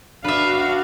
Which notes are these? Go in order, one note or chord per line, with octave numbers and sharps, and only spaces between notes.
D4 F#4 B4 E5 F5